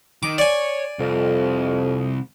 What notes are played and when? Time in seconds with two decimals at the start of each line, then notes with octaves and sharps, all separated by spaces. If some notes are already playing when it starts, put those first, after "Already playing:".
0.23 D#3 D#4 D6
0.38 C#5 D5 G#5
0.99 C2 F2